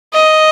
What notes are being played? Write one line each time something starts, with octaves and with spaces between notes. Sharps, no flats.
D#5